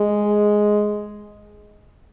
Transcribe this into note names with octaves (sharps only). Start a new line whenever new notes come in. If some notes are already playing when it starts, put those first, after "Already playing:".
Already playing: G#3